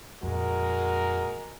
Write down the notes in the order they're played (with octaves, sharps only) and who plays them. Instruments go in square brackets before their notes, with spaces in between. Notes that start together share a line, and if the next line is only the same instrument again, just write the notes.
[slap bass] F2 A#2 [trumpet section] G#3 A#4 [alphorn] F#4